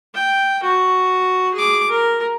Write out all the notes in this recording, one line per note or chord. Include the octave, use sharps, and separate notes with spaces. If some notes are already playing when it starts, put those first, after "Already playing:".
G5
F#4
G#4 D6
A#4